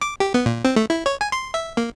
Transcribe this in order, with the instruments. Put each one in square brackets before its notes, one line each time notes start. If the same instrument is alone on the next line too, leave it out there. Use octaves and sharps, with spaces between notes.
[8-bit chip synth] D6
G4
B3
A#2
C4
A3
E4
C#5
G#5
C6
E5
A#3